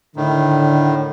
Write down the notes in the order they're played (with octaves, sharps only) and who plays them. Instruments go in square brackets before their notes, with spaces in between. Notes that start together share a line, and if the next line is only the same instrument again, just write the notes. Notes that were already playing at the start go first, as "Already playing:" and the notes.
[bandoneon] A2 D#3 [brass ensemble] D3